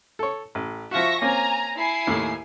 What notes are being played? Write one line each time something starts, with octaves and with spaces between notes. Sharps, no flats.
A4 C#5
A1
F3 F4 F#4 E5 C#6 A#6
A#3 C4 C#4 G#5 A#5
E4 G#5 C7
D#2 A2